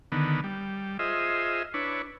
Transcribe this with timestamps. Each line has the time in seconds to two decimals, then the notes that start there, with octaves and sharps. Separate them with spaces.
0.12 D3 D#3 B3
0.44 G3
0.99 F4 G#4 C5 D#5 E5
1.74 D4 E4 B4 C#5